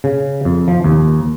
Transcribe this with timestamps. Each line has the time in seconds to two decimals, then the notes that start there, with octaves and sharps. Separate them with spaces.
0.04 C#3
0.45 F2
0.68 F3
0.84 D#2